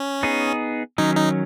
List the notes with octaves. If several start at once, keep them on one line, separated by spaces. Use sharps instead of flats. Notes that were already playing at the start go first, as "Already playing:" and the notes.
Already playing: C#4
B3 D#4 G#4
D#3 F#3 C#4 D#4
D#4